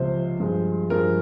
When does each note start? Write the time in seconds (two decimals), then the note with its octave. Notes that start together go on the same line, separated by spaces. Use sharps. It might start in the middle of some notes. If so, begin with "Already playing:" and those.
Already playing: C#2 C3 F3 C5
0.39 G2 F3 G#3
0.90 G2 F3 G#3 A#4